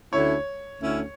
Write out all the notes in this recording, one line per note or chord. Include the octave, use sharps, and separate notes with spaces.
D2 D3 A3 C#4 E4 C#5
D2 D3 A3 C#4 E4